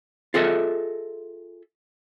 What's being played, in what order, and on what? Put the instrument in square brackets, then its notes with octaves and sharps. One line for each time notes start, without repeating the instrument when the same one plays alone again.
[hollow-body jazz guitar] F4 G#4 A4 D#5 E5